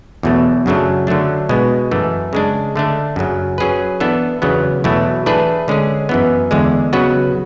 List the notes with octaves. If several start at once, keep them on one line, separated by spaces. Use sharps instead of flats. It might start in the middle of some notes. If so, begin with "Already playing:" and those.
E2 B2 F#3 A3
F#2 C#3 F#3 A3 D4
D3 F#3 A3 D4
B2 G#3 B3
F#2 E3 A3
C#3 G#3 D4
D3 A3 D4
F#2 C#3 F#3
F#3 C#4 G#4 B4
E3 B3 D4 A4
E2 C#3 F#3 B3
E2 B2 F#3 A3 E4
E3 A3 D4 G#4 B4
D3 G#3 C#4 G#4
F#2 E3 B3
E2 D3 G#3
C#3 F#3 B3 F#4 B4